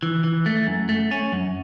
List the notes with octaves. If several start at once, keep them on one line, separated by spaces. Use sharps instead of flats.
E3
E3
A3
F#2
A3
C#4
F#2